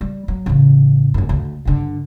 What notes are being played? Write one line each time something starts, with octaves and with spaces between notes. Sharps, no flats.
G3
F#3
A1 C#3
F#1 F#2
D2
G2 D3